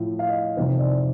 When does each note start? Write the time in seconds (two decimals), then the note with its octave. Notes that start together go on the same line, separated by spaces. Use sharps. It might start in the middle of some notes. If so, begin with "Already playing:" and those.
Already playing: A2 F3
0.19 F5
0.29 D#5
0.57 F2 C3 D#3 C5
0.79 D5